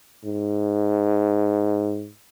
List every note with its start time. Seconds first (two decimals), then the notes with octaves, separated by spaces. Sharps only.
0.25 G#2